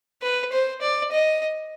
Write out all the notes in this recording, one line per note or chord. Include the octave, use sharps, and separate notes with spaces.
B4
C5
D5
D#5